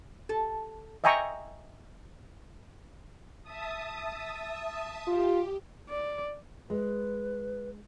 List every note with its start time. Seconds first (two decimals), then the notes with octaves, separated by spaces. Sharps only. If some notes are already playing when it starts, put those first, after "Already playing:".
0.29 A4
1.04 D#5 E5 G5 G#5 A#5 C#6
3.43 E5 A5 D#6
5.07 F4 G4
5.90 D5
6.70 G#3 B4